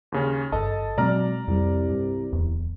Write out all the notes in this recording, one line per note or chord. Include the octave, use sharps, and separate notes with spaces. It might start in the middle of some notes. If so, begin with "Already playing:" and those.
D#2 C#3 C#4
G#1 G2 A4 D#5 A5
B2 F#3 G#3 C4 D5 A#5 F6
C2 F2 G3
G2
D1 E2